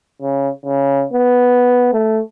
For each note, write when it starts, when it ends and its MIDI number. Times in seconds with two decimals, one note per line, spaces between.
0.22 0.49 49
0.66 1.04 49
1.13 1.93 59
1.93 2.21 57